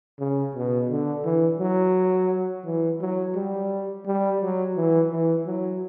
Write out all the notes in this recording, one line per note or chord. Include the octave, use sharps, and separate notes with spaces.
C#3
B2
D3
E3
F#3
E3
F#3
G3
G3
F#3
E3
E3
F#3